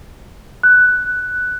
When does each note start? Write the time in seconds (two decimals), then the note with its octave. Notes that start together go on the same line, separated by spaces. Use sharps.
0.63 F#6